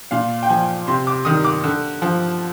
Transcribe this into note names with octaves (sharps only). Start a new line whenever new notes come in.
A#2 F5
G5
F3 G#5
C3 C6
D6
D#3 G3 D#6
D6
D3
F3